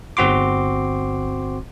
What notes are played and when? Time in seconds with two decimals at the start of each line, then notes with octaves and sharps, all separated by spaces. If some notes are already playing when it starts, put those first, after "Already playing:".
0.17 G1 C4 F#4 C6 D6